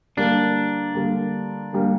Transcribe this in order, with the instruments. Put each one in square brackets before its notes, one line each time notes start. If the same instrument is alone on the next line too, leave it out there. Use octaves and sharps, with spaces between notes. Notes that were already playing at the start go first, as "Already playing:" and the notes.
[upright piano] D3 G3 A#3 [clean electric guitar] D4
[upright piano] D3 G3 A#3
D3 G3 A#3